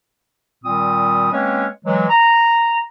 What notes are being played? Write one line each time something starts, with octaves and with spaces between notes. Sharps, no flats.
A#2 D#3 G3 C4 D#6
G#3 A#3 C4 C#4 B4 C#5
E3 F#3 G#3
A#5